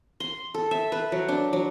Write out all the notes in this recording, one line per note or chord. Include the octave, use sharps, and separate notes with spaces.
C6
A4
E5
B4
F#3
D4
F#3